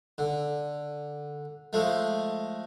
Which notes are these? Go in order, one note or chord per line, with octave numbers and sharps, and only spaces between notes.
D3
F3 G#3 A3